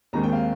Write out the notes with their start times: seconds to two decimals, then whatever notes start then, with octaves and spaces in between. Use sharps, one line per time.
0.13 D#2 D#3 G#3 C4 A#5
0.23 G5
0.33 F5